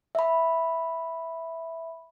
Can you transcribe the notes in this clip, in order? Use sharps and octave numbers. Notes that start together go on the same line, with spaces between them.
E5 B5